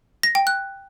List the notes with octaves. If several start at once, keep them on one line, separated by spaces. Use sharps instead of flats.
A#6
G5
F#6